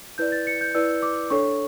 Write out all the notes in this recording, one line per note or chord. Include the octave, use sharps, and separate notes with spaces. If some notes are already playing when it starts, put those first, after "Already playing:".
E4 B4 D5 G6
A6
C#7
G6
E4 B4 D5 E6
D6
D4 A4 C#5 C#6